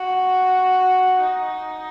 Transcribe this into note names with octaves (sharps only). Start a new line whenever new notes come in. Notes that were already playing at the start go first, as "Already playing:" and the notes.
Already playing: F#4
D#4